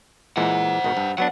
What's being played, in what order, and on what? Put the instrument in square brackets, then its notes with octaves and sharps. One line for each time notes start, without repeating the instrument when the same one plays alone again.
[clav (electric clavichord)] A#2 E3 G#3 [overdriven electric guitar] C5 F#5
[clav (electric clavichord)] G#1 B2 D#3
G2
[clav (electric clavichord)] F#3 B3 D4 [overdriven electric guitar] F#5